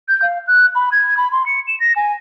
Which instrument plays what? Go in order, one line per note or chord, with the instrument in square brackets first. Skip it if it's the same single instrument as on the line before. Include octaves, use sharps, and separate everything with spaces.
[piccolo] G6
F5
F#6
B5
G#6
B5
C6
C#7
E7
A#6
G#5